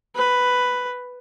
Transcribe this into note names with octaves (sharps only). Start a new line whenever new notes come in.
B4